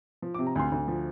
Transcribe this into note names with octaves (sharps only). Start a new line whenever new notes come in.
F3
D6
C3
A#5
D2 C6
D2
F3